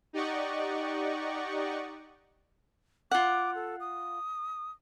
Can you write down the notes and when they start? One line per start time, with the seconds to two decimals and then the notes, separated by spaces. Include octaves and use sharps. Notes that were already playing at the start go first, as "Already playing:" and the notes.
0.13 D#4 G4 D5 D#5 F#5 C#6
3.11 F4 F#5 D6
3.55 A4
3.80 D#6